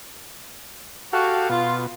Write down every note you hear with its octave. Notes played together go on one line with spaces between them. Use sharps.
F#4 G4 A4 F5
B2 F4